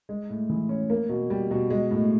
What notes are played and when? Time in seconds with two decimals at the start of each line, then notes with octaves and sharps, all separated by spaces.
0.09 G#3
0.30 A2
0.50 E3
0.69 C#4
0.90 A#3
1.09 B2
1.30 G3
1.51 B2
1.70 G#3
1.91 A2